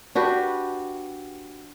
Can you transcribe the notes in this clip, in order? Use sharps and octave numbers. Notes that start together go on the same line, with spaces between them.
D4 F#4 G4 B4